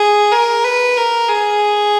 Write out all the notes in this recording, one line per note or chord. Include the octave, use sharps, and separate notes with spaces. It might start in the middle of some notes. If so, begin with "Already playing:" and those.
Already playing: G#4
A#4
B4
A#4
G#4